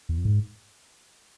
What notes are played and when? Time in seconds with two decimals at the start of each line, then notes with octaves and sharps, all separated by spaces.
0.09 E2
0.18 F2
0.25 G#2